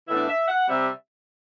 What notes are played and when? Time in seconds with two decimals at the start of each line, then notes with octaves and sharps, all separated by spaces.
0.08 A2 E3 B3 D4 E5
0.28 E5
0.48 F#5
0.67 C3 G3 C4 E5